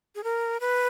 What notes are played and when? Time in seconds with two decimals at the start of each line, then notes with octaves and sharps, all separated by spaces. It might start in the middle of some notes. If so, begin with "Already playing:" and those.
0.15 G#4
0.24 A#4
0.60 B4